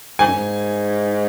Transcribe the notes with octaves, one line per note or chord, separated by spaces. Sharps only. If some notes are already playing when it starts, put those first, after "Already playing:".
G#2 G#5
F#2
G#2